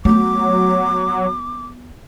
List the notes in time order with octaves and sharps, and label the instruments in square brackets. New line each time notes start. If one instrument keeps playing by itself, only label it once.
[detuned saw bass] F#3 [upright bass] A3 B3 [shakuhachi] D6